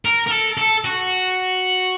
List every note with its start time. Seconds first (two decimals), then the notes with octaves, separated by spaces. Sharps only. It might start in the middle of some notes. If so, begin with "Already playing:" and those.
0.05 A#4
0.27 A#4
0.31 A4
0.57 A4
0.84 F#4